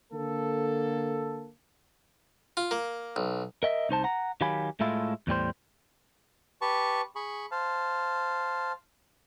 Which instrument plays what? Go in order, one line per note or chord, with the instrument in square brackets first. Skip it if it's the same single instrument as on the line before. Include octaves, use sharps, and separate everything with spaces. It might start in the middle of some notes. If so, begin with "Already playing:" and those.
[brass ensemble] D3 A#3 A4
[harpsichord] F4
A#3
B1
[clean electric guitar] A#4 D#5 E5
C2 D#4 C5 A5
F#5 A#5
D#3 F#3 G4 F5 G#5 B5
A2 G#3 A3 E4 F4
E2 A2 G3 C5
[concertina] G4 B4 A5 C#6
G#4 B5 C#6
C5 F5 A5